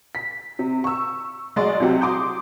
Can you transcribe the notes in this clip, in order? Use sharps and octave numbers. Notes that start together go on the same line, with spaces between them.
B6
C3
C#6 E6
F#3 G#3 F#4 D5 D#5 C6
C2 C3 F#3 G4
C6 D6 D#6 G6